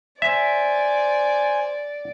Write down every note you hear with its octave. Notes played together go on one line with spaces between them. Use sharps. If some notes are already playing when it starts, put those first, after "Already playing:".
C5 D5 E5 G#5